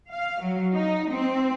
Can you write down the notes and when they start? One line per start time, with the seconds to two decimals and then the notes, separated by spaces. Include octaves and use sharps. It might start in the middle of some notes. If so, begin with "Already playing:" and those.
0.11 F5
0.41 F#3
0.73 D#4
1.10 C4